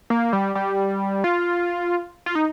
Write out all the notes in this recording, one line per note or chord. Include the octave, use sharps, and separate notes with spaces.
A#3
G3
G3
F4
F4
D#4